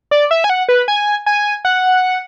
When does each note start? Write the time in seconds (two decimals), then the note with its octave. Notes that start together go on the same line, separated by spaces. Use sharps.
0.11 D5
0.31 E5
0.44 G#5
0.50 F#5
0.69 B4
0.88 G#5
1.26 G#5
1.65 F#5